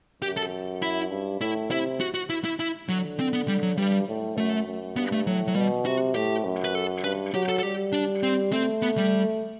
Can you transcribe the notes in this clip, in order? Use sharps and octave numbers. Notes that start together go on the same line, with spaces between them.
F#2 G4
A4
E4
G2
A2 E4
C3 E4
F#4
F#4
E4
E4
E4
D3 F#3
C4
B3
G3
F#3
G2 G3
A2
F#2 A3
F#2
G2 B3
A3
A2 F#3
F#3
B2 G3
C3 F#4
A2 G4
F#2
B4
A4
G2 B4
F#3 G4
A4
A4
G3 G4
D4
C4
A3 C4
B3
G3